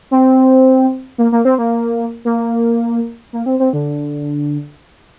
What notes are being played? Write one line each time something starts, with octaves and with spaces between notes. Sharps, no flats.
C4
A#3
A#3
C4
A#3
A#3
A#3
C4
C4
D3